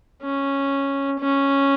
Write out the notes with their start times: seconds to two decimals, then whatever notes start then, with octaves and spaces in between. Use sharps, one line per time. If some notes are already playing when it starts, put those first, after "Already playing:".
0.23 C#4
1.20 C#4